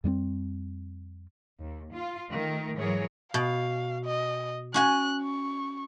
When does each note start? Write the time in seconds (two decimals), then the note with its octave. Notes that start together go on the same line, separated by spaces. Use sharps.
0.04 F2 G3 B3 C4
1.59 D#2
1.92 F4
2.30 D#3 A3 A#4
2.77 G#2 E3 F#3 G#4 A#4 C#5
3.34 B2 F5
4.05 D#5
4.74 C#4 F#4 G#5 F#6
5.22 C#6